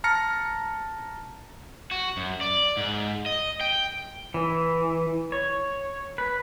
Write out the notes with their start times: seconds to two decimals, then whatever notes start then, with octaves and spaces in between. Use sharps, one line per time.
0.04 A5 A#5 F6 A#6 C#7
1.91 F#4
2.17 F#2
2.41 D5
2.77 G#2
3.26 D#5
3.61 G5
4.34 E3
5.32 C#5
6.18 B4